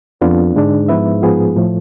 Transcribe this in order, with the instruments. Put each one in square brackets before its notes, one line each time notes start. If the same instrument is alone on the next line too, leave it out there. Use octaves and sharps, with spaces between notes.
[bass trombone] F2 [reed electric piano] B3 D4 F4
[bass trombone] G#2 [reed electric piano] D3 G#3 D4
[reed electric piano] F3 B3 E4 B4 E5
A2 F3 B3 F4 G#4
A2 F3 A3